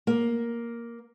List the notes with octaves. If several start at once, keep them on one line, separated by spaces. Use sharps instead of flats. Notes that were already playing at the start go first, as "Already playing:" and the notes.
A#3